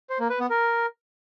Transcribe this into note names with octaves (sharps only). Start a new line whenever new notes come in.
C5
A#3
B4
B3
A#4